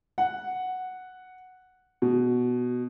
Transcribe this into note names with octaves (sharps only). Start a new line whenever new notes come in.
F#5
B2